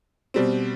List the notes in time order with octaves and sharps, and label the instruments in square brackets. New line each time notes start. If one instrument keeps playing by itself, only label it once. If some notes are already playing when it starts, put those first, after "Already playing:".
[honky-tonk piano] B2 G3 C4